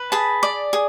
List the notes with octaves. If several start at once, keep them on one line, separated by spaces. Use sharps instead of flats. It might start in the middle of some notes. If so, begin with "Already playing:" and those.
Already playing: B4
G#4 A5 B5
D5
G#4